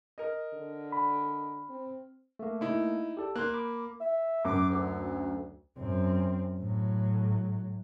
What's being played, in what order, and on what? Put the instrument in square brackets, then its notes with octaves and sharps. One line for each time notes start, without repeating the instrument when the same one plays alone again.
[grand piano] A#4 D#5
[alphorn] D3
[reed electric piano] B5
[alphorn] C4
[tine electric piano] A3 A#3
[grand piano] D#4 E4
[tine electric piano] G4 A4 D5
[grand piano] A#3 [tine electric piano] C6 F#6
[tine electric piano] B5 D6
[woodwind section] E5
[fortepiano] F#2 [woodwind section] D6
[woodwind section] D2
[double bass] F#2 C4
A2 F#3